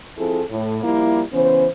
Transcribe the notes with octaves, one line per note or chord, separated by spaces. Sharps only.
F3 C4 E4 F4 G#4 A4
A2
F3 G3 A#3 E4
C#3 E3 B3 C#4 C5